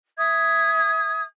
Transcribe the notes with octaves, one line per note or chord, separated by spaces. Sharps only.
E5 D#6 G#6